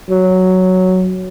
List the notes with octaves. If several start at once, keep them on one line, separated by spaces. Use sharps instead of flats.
F#3